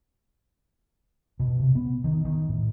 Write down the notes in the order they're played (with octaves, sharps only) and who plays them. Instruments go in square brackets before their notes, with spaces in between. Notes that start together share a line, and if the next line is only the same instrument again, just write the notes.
[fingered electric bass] B2
C3
B3
D#3
D#3
A2